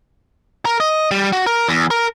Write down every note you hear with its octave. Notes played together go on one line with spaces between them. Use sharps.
A#4
D#5
G3
F#4
A#4
E2
A#4